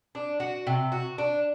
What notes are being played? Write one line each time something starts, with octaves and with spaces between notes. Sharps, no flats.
D4
F#4
C3
F#4
D4